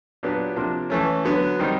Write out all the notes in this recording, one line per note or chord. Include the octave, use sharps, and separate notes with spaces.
A#2 F#3 B3 D4 G4
C3 F3 A#3 D4
E3 A3 C#4
D3 F#3 B3
D#3 G3 C4 D#4